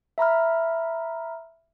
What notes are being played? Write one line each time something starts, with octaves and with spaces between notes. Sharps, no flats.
E5 A#5 B5 F6